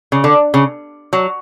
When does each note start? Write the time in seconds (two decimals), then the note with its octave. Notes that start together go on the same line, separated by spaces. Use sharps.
0.12 C#3
0.24 D3
0.54 C#3
1.13 F#3